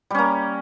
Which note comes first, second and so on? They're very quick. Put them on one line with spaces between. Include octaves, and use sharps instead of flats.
G3 C#4 A#3